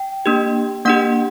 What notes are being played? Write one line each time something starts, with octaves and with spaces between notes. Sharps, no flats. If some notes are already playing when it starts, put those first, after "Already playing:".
Already playing: G5
A#3 D4 G4
A#3 D4 G4 F#5